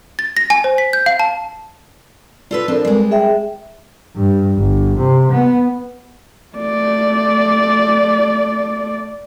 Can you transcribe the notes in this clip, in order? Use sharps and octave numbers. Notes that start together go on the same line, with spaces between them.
A6
A#6
G#5
C5
B6
G6
F5
A5
F4 A4 B4 D5
F3 C4 D4 A4 A#4
G3 G#3
G#4 E5 G5
G2
G1
C3
B3
A3 D5